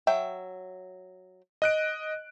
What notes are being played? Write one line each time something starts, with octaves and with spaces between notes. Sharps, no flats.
F#3 E5 G5
D#5 F#6 D7